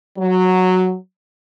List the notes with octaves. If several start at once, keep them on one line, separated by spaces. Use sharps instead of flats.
F#3